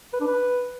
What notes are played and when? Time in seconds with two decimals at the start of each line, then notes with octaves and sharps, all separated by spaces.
0.13 B4
0.20 D4
0.27 B4